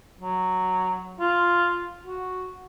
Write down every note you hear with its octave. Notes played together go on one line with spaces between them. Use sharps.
F#3
F4
F#4